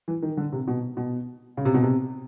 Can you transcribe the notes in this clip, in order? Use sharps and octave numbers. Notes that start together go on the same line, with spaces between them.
E3
D#3
D3
C3
B2
B2
C#3
C3
B2
C3